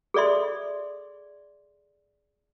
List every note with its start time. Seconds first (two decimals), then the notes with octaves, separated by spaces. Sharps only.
0.14 G#4 A4 D5 E5 C6